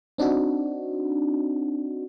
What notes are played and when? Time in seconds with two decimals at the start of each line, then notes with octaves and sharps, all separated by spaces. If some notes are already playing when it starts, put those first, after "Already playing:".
0.18 C4 D4 D#4 F#4